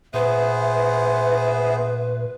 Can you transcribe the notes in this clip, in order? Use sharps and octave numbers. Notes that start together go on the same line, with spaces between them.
A#2 B3 G#4 B4 C5 E5